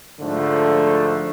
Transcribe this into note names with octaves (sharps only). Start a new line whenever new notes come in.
G#2 D3 F3 A3